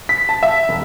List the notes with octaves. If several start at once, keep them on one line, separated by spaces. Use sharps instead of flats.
B6
A5
E5
E1